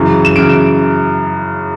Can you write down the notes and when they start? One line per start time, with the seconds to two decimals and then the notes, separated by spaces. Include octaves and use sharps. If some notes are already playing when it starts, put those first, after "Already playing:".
Already playing: F#2 C#3 E3
0.25 E7
0.36 F#2 C#3 E3 D7